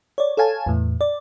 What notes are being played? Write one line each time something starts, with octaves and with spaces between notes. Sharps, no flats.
C#5 D5
A4 C#5 F5 G#5 A5
E2 A2
D5